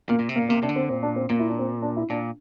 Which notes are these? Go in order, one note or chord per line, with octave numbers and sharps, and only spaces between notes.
A#2 A#3
A#2
C3
A#3
A#2
C3 A#3
C3 D4
D3
C4
A#2 C4
D4
C4
A#2 A#3
E4
D4
C4
D4
E4
A#2 D4